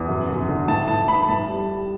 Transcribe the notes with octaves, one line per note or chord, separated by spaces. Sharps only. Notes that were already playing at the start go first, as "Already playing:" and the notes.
Already playing: E2
F#2
F#2
D3
A2 A5
A2 A5
A3 B5
A2 A5
G3
G3